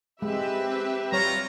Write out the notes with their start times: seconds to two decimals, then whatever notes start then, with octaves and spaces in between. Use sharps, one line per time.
0.22 G#3 C4 G4 B4 E5
1.12 G3 F4 C#5 A#5